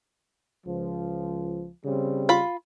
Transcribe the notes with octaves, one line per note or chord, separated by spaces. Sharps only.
C#2 F3
C#3 G3 C4
F4 B5